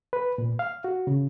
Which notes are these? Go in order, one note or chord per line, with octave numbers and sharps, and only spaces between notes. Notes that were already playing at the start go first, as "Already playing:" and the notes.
B4
A#2
F5
F#4
C#3